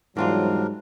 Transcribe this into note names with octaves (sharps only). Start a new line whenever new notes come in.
E2 G#2 F#3 G3 C4 D4 F4 A#4